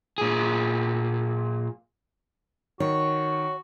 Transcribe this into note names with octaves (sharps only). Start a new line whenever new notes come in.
A#2 G#4
D#3 F#4 C#5